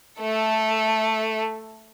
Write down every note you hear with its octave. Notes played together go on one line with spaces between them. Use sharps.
A3 A4